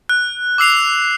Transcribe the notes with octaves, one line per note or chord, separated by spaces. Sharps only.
F#6
D6 E6 C7 F7